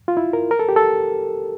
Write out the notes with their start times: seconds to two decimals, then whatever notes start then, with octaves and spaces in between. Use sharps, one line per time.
0.08 F4
0.17 E4
0.33 A#4
0.51 A#4
0.59 A4
0.69 G4
0.76 A4